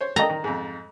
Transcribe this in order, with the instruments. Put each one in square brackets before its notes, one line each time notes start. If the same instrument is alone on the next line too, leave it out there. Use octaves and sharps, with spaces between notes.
[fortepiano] C5 C#5
[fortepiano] A4 D#5 [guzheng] A#5
[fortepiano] D#3
F2 G#2